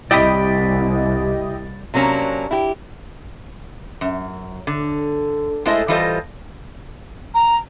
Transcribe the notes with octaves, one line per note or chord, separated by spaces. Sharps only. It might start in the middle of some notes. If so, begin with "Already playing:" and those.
C2 E4 G4 D5 D#5 G5 B5
C3 F#3 A#3 C#4 D4
E4 G4
F#2
D3
G#3 A3 E4 A4 C5 D#5
E3 G3 F4 A4 C5 D#5
A#5